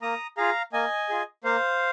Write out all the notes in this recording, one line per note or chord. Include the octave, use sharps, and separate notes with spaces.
A#3 A#5 D#6
F4 G#4 F5 A#5
A#3 D#5 G#5
F4 G#4
A#3 C5 F5